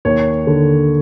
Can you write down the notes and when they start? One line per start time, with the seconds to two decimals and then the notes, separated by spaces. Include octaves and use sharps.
0.05 D#2 C#5
0.47 D3